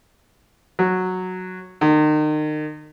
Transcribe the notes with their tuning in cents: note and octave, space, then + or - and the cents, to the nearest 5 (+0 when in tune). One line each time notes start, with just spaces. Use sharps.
F#3 -5
D#3 -35